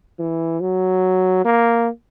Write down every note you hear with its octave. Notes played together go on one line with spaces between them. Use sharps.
E3
F#3
A#3